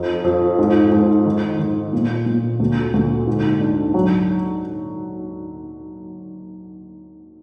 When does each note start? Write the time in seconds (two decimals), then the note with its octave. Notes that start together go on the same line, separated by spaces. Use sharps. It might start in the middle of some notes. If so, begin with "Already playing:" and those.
Already playing: F2 D#4
0.24 F2
0.59 G#2
0.92 G#2
1.26 D#3
1.59 D#3
1.93 A#2
2.26 A#2
2.60 D2
2.94 D2
3.27 G#2
3.61 D4
3.94 F#3